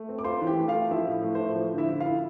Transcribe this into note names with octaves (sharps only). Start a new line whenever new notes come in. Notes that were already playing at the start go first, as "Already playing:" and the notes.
Already playing: A3
C4
D6
F4 C5 C6
E3
G4 G5
A3
F4 F5
A3
F3 E4 E5
A2
A3
A2 C5
F3
D3
E4 E5
E4
E4 F4 F5